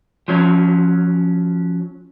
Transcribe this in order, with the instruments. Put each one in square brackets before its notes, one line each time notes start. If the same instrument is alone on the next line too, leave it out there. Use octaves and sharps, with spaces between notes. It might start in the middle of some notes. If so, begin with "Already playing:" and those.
[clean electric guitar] F3 F#3 C#4